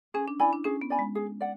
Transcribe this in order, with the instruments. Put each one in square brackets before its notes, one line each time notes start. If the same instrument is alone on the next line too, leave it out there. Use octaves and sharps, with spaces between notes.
[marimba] C#4 [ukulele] G#4
[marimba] D4
[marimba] E4 [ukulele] D5 G#5 B5
[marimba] D4
[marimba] C#4 [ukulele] G#4
[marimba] B3
[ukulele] D5 G#5 B5
[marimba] G#3
[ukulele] G#4
D5 F#5